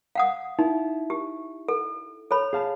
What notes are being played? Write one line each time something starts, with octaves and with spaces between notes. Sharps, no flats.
F5 F#5 D#6
D#4 E4
G4
A4
A4 C#5 B5
G#4 F5 A5